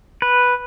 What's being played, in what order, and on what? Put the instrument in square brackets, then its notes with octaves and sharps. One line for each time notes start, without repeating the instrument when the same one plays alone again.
[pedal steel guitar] B4